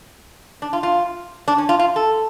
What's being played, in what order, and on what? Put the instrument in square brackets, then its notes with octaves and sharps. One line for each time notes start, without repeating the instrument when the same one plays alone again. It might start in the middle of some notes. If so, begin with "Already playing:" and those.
[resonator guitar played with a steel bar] D4
F4
F4
D4
C#4
F4
F4
A4